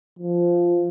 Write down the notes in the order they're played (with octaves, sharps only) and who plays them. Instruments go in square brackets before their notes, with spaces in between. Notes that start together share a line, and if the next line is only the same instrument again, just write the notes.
[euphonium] F3